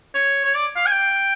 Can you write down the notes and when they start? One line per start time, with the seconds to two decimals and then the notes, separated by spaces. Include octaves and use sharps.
0.15 C#5
0.45 C#5
0.55 D5
0.76 F5
0.86 G#5
0.91 G5